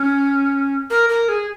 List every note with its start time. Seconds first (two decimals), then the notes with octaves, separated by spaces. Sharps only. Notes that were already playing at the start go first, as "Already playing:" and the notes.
Already playing: C#4
0.90 A#4
1.09 A#4
1.29 G#4